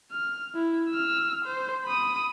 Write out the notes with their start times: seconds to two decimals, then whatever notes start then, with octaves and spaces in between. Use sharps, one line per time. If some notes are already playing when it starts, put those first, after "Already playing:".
0.11 F6
0.55 E4
0.90 E6 F6
1.45 C5
1.84 B5 D#6